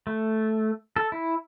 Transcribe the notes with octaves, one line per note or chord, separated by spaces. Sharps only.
A3
A4
E4